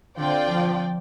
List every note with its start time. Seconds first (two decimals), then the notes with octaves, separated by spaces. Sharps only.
0.17 D3 C4 F4 D5 G5
0.48 F3